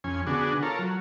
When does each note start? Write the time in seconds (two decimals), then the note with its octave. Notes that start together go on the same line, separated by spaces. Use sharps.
0.04 F2 C#4 G#5
0.27 D3 B3 D4 F#4 G#4
0.63 F4 A4 A#4 C#5
0.79 F#3